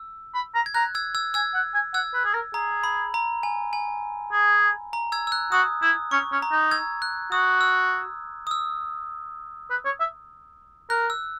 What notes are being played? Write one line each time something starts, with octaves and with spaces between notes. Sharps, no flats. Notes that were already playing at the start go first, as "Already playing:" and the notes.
Already playing: E6
B5
A#5
G#6
A#5 F#6
E6 G#6
E6 G#6
G#5 E6 G#6
F#5
G#5
F#5 E6 G#6
B4
G#4
A#4
G#4 A#5
B5
A#5
G#5
G#5
G#4
A#5
E6 G#6
E6
F#6
F#4 D#6
E4 D#6
C#4 C#6
C#4
A#5
D#4
E6 G#6
F#6
F#4 D#6
E6
D#6
E6
B4
C#5
E5
A#4 F#6
E6